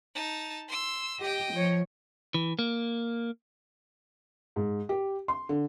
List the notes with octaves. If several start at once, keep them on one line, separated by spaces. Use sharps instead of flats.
D#4 A5
C6 E6
G4 D#5 G5
F3 C#5
E3
A#3
G#2
G4
C6
D3